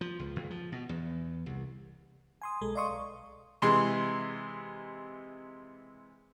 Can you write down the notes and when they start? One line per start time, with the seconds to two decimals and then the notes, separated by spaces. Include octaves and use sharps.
0.01 F3
0.19 C#2
0.36 C#2
0.50 F3
0.72 B2
0.89 E2
1.46 C2
2.42 G#5 C6 D#6
2.61 B1 G#3 A4
2.75 D5 D#5 F5 C6 C#6 D#6
2.89 B1
3.62 C3 E3 G#3 C6